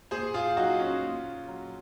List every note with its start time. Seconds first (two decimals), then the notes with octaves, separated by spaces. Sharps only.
0.11 A#2 G#4 C5
0.34 F4 G#4
0.57 F#3 D#4 F#4
0.80 C#4 F4
1.02 A#2
1.48 F#3